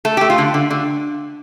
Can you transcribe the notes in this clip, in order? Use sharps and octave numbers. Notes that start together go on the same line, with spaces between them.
A3 A4
A3 G4
F4
D3
D3
D3